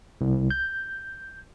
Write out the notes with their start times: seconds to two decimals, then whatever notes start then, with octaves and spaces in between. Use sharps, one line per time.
0.21 C2
0.50 G6